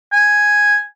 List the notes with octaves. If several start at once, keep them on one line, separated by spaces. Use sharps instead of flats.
G#5